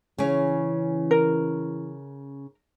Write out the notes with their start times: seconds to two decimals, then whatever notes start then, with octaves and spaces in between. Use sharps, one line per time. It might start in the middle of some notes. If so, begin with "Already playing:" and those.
0.18 C#3 E3 C#4
1.11 A#4